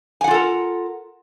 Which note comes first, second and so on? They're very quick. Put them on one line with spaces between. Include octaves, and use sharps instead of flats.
G#5 F#5 F4 A4 A#4